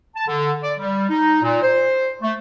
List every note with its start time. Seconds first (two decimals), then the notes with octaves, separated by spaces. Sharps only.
0.15 A5
0.28 D3
0.62 D5
0.79 G3
1.10 D#4
1.43 A#2
1.62 C5
2.22 A3